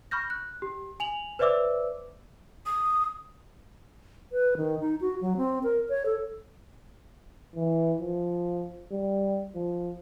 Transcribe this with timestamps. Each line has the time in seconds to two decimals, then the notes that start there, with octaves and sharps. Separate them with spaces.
0.11 B5 C#6 F6 G6 A#6
0.30 F#6
0.62 G4
1.00 G#5 F7 F#7
1.39 B4 C5 D5 E5 D6 E6
2.66 D#6
4.32 B4
4.57 D#3
4.80 D#4
5.01 F#4
5.21 F#3
5.37 C4
5.64 A#4
5.89 C#5
6.06 A4
7.56 E3
8.01 F3
8.92 G3
9.55 F3